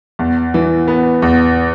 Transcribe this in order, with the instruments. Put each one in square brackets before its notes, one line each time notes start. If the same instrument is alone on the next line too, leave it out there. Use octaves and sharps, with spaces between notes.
[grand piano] E2
E3
B3
E2